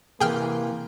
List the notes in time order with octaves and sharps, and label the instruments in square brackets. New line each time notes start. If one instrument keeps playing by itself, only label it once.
[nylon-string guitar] C3 E3 [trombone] A#3 [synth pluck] G#4 G5 F6